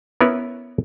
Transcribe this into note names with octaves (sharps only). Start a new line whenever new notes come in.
B3 C#4 E4 A#4 B4